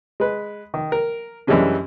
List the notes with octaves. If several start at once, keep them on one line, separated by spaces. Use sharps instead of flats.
G#3 B4
D#3
A#4
F#2 E3 G3 G#3 C#4 D4